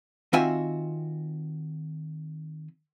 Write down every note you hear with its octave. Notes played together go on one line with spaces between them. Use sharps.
D#3 C4 F4 F#4 E5 G#5